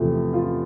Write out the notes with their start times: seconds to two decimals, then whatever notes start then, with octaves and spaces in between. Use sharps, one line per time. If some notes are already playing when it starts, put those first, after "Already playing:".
Already playing: E2 C3 F3 A3
0.33 F4